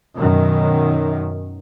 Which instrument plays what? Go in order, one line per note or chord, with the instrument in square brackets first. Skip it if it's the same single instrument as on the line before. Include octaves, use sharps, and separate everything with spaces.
[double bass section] F#2 B2 D#3